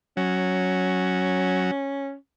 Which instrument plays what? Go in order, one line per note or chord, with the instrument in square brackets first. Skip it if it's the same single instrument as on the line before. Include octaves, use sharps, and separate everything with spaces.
[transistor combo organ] F#3 [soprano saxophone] C#4